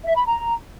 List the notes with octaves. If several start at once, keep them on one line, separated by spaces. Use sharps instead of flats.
E5
B5
A#5